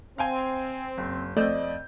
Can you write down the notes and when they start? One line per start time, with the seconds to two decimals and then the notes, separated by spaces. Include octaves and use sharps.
0.18 C4 F5 G5 G#5
0.98 F#1
1.37 F2 A3 C4 D5 D#5 G6